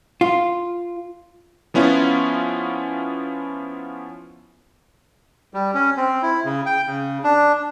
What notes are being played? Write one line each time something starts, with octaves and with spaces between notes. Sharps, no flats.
F4
F3 B3 C#4 E4 F4
G3
C#4
C4
E4
C#3
G5
C#3
D4